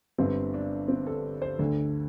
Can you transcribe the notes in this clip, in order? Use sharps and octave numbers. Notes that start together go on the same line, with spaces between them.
G1 G2 D3 C4
D4
C4
A4
C5
D2 D3 A4